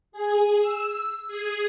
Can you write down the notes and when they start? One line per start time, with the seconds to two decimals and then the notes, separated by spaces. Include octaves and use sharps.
0.12 G#4
0.61 E6
1.27 G#4